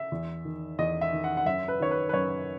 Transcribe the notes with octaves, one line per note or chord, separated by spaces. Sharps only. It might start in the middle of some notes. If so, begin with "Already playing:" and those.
Already playing: E5
E2
D#3
E2 D#5
E5
D#3
F#5
F#5
F#2 E5
B4
D#3 C#5
B4
B4
F#2 C#5